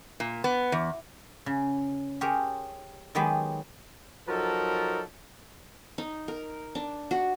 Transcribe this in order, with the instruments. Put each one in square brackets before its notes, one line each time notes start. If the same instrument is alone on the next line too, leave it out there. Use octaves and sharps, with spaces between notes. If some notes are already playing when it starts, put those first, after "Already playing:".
[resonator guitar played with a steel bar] A#2
B3
E2
[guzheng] C#3
G4 G#4 A#4 C5 C#5
D#3 F#3 G#3 B3 G4 B4
[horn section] F3 F#3 D#4 F#4 A4 A#4
[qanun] D#4
A#4
D4
F#4